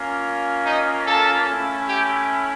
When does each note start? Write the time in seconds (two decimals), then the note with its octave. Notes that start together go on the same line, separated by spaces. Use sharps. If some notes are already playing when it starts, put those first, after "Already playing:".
Already playing: A#3 C#4 F4
0.65 D#4 D#5
1.06 A4 A5
1.47 A3 C#4 E4
1.88 G4 G5